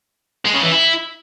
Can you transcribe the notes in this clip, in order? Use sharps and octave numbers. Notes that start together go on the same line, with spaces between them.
G#3
C#3
E3
E4